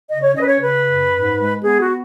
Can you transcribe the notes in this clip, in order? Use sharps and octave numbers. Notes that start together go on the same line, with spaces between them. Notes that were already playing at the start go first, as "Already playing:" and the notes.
C#3 D#5
C#5
C#4 D#5
B4
C#5
C#3 B4
F#2
G#2
G#3
B3 G#4
F#4